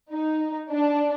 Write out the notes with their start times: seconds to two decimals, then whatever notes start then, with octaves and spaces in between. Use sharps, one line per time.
0.11 D#4
0.71 D4